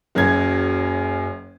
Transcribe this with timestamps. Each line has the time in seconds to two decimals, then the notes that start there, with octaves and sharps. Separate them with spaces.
0.15 F#1 F#2 F#3 G#6